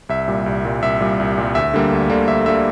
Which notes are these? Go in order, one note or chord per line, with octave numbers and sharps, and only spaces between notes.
C2 E5
A#2 G3
C2
A#2 G3
C2 E5
A#2 G3
C2
A#2 G3
D2 E5
D3 G3 A#3
D2
D3 G3 A#3
D2 E5
D3 G3 A#3 E5